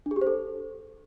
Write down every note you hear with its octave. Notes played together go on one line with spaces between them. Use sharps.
D4
G#4
G4
C5
A4